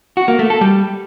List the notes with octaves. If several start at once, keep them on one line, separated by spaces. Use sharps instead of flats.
F#4
A#3
A3
A4
G3